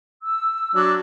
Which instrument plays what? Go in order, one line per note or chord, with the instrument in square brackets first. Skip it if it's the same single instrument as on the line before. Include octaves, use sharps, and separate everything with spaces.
[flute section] E6
[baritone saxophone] F#3 [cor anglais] D4